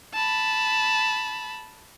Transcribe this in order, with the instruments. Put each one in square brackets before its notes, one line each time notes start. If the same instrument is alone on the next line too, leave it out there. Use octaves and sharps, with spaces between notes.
[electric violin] A5 B5